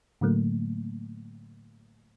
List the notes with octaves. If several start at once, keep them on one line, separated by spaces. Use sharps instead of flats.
A2 D3 F#3 A3 A#3